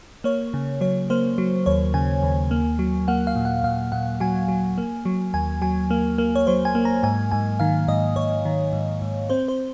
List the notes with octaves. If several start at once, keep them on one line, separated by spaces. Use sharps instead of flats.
A#3 C#5
C#3
F#3 C#5
A#3 C5
F#3
D#2 C#5
C#3 G#5
D#2
A#3
F#3
A#3 F#5
F5
A#2
F#5
A#2 F5
A#2 F#5
F#3 G#5
F#3
A#3
F#3
D#2 G#5
F#3 G#5
A#3
A#3
C#5
F#3 C5
G#5
A#3
A#5
G#2 G#5
G#2 G#5
D#3 F5
G#2 D#5
G#2 C#5
D#3
G#2
G#2
C4 C5
C5